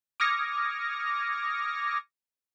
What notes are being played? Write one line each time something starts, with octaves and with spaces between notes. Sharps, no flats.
D6 D#6 F6 G#6 A#6 C#7